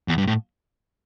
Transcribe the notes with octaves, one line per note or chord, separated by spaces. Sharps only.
E2
G2
A2